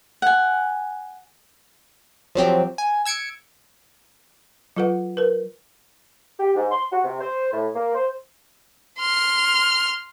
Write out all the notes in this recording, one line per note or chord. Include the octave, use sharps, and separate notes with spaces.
F#5 G#5
F3 F#3 C4 G4
G#5
E6 G#6 C#7 D7
F#3 F4 A4 B4 F#5
A#4 B4
G4
G#2
C6
F#4
C3
C5
A2
A#3
C5
C6 F6